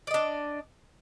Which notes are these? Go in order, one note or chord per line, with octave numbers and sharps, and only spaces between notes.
D4 D5 D#5